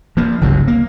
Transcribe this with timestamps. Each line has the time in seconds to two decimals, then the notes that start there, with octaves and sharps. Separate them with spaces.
0.17 F3 A#3
0.41 G1 C#2 C3 F#3
0.68 A#3